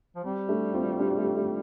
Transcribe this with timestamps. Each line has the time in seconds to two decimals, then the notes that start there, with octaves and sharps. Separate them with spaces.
0.16 F3
0.24 G3 C4
0.49 A3 D4
0.74 C4 F4
0.99 D4 G4
1.17 A3
1.36 A3